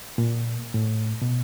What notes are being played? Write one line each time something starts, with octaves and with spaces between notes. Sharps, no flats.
A#2
A2
B2